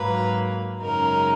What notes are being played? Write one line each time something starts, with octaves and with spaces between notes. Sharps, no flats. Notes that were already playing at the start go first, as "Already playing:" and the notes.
Already playing: G#2 F#3 A#3 B4
F#2 C#3 G#3 D#4 A#4